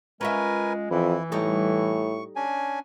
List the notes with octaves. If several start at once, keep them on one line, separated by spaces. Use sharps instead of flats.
G#3 C#4 F4 A#4 B4 E5 G#5
F2 E3 E4
A2 G3 D#4 A4 C#6
C#4 D4 G#5